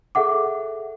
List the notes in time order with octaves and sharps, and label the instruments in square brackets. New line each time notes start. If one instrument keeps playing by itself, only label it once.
[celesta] G#4 A4 E5 F#5 D6